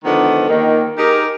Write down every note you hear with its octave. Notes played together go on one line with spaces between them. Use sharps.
D3 D#3 F3 G#3 B3
D#2 D#3
D#4 G4 G#4 A#4